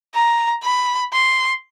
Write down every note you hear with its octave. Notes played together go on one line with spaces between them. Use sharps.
A#5
B5
C6